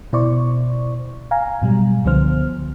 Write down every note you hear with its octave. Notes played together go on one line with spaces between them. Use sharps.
B2 E4 C5 D5 C#6
F5 G#5 A#5
G#2 B2 F#3 G3
C#2 D3 F3 B3 C5 F6